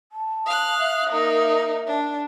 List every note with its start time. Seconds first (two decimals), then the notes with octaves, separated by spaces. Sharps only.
0.12 A5
0.46 F5 D#6 F#6
0.79 E5
1.10 A#3 D#4
1.87 D4